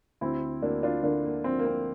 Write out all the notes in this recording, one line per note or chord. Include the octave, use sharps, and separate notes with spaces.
D2 C4 E4
D2 A#3 D4
D4 F4
D3 A#3 D4
A#3
F3 C4
A#3
C4